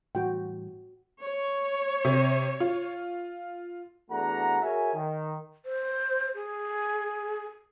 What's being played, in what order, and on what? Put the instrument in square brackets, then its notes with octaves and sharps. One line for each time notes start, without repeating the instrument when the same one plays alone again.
[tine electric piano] A2 E3 G3 [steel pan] F#4 G5
[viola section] C#5
[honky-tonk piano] C3
F4
[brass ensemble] E2 A3 D4 F#4 F#5 A#5
F#4 G#4 A#4 C#5 E5 G#5
D#3
[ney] C5
G#4